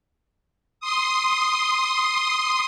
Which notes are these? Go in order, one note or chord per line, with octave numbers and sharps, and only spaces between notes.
C6 D#6